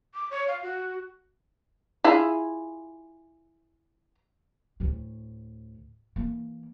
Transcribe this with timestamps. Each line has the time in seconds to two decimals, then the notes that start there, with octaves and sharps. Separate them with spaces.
0.14 D6
0.31 C#5
0.48 F5
0.63 F#4
2.04 E4 F4 G#4
4.80 D2 A2
6.16 E3 A#3